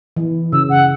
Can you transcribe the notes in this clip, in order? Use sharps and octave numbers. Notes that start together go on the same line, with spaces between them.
E3
C#3 E6
F#5